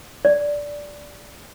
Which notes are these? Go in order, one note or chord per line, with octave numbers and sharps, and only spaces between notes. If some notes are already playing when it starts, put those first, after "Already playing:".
D5